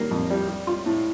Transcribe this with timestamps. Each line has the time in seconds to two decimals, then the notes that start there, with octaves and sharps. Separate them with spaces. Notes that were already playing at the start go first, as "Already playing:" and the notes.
Already playing: D#3 G3 A#3
0.11 F2
0.30 G3
0.48 G3
0.67 F4
0.86 A2